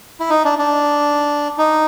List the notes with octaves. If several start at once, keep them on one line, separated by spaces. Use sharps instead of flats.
E4
D#4
D4
D4
D#4